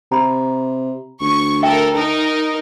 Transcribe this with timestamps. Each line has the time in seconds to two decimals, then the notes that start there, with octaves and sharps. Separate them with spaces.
0.12 C3 A#5 B5
1.21 D2 C#6
1.63 A4 A#4 E5 G5
1.94 D#4 A#4